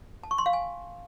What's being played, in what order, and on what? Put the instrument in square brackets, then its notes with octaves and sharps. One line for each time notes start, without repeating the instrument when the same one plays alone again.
[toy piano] A5
C#6
C6
F5
G#5